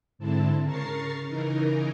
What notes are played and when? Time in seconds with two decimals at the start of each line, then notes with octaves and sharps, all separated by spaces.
0.18 G#2 D3 C4 E4 A5
0.64 C#3 A#4 A#5 C#6 A6 C7
1.27 C#3 E3 D#4 A#4